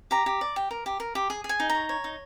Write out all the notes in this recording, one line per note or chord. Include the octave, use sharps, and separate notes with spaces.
G4 A#5
G4
D5
G4
A#4
G4
A#4
G4
G#4
G#4
G#5
D#4
A#5
C#5
C#5
D#4